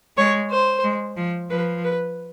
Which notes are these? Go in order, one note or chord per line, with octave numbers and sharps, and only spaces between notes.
G#3 C#5
C5
G#3
F3
F3 B4
B4